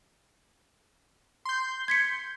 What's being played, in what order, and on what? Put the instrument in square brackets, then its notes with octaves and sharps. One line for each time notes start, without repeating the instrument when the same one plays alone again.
[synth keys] C6 G6
[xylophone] G#6 B6 C#7